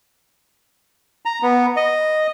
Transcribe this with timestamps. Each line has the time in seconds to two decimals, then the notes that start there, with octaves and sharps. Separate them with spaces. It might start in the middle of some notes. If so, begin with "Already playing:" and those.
1.25 A#5
1.43 B3
1.76 D#5